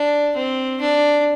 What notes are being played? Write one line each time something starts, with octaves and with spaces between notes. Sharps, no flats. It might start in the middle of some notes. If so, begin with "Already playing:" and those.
Already playing: D4
C4
D4